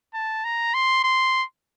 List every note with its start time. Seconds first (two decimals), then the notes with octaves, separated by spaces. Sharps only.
0.14 A5
0.44 A#5
0.74 C6
1.04 C6